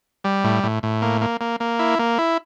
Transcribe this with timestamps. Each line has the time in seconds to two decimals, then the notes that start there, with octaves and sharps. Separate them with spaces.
0.24 G3
0.44 A2
0.64 A2
0.83 A2
1.02 A#3
1.21 A#3
1.41 A#3
1.60 A#3
1.79 E4
1.99 A#3
2.18 E4